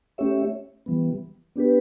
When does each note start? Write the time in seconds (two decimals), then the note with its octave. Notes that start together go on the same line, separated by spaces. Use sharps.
0.18 A3 C#4 G4 C#5 E5
0.86 E3 G3 B3
1.56 B3 D4 G4 B4